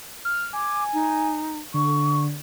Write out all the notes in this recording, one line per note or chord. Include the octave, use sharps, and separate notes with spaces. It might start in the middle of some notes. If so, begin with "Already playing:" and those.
F6
G#5 D6
D#4
D3 C#6